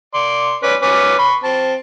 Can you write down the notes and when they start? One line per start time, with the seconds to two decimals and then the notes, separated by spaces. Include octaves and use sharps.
0.14 D5 C6
0.63 C#4 B4 D5
0.82 C#4 B4 D6
1.19 B5 C#6
1.44 C4 A5